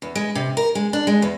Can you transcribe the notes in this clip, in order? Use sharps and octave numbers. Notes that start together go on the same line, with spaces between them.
E2
G#3
C3
A#4
G#3
D4
G#3
E2